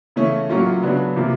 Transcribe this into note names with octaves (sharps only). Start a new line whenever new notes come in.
C#3 E3 A3 C#4
A2 F#3 A#3 C#4 F4
C#3 F#3 B3 D4
C3 F3 A#3